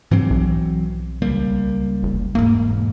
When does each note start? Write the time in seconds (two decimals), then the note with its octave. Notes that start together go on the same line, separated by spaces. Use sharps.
0.11 G#2 E3 F#3 C4
0.30 B1
1.22 C#2 G3 A#3
2.03 F#1
2.35 E1 G#2 A#3